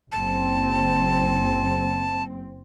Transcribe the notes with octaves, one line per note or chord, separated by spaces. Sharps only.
F#1 C4 A5